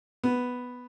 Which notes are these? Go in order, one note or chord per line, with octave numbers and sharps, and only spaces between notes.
B3